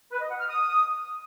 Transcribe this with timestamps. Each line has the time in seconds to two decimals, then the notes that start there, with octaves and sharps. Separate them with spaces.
0.12 B4
0.21 D#5
0.31 F#5
0.40 F6
0.49 D#6